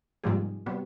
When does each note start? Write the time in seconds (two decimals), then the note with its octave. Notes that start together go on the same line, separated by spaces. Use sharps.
0.24 G#2 C3 F3 G3 A#3 G#4
0.66 C3 F#3 G3 B3